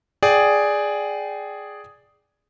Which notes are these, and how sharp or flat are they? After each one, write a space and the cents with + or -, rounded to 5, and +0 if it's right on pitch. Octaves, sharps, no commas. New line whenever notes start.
G#4 +0 D5 +0 G5 -20